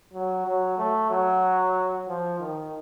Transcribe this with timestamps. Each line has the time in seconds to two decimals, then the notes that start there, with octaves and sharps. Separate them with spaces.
0.13 F#3
0.46 F#3
0.78 A3
1.11 F#3
2.08 F3
2.40 D#3